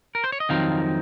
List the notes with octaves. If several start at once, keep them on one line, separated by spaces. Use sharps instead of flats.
A#4
C5
C#5
D#5
F2 D#3 F#3 C4 D#4 F5